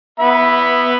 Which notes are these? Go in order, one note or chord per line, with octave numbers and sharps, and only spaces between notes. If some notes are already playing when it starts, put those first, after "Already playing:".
B3 E5 B5